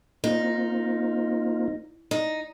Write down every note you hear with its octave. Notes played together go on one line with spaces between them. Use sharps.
A#3 C4 D#4 F4
D#4